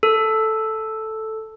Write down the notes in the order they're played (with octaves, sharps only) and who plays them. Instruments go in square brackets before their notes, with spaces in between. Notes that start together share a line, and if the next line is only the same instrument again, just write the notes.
[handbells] A4